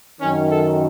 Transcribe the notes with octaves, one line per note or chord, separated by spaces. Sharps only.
F#2 D#3 C#4
A4